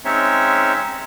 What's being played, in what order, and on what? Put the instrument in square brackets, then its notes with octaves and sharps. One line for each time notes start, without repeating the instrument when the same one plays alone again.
[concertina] G#3 C4 C#4 D#4 C#5 E5